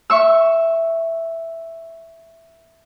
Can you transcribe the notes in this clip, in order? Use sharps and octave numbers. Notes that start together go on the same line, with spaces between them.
E5 C#6 E6